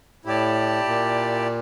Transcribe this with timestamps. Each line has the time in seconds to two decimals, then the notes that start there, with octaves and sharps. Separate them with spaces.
0.25 A2 E4 G4 D5 A5
0.86 A#2